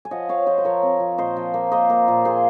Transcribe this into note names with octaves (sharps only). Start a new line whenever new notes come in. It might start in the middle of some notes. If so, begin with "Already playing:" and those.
G#5
F3 D#5 F#5
F3 C#5 F5
F3 C5 D#5
C5
F3 A#4 C#5
C4
F3
A#2 C5 D#5
F3
A#3
A#3 C5 D#5
A#3
A#2
A#3 G#4 C5